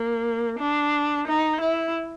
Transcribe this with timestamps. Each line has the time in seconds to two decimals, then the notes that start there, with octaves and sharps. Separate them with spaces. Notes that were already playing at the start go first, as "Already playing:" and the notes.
Already playing: A#3
0.59 D4
1.27 D#4
1.60 E4